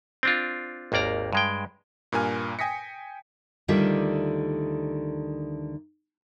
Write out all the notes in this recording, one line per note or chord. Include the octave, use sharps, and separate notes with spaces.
C4 D4 F4
G#1 D#2 A#3 D5 A#5
G2 G#3 G5
G2 A#2 A#4 G#5 F6
G5 G#5 D#6 A#6 B6 C#7
D2 D3 D#3 G3 F4 E5